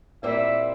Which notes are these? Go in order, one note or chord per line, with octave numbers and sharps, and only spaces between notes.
A#2 G3 C4 E4 E5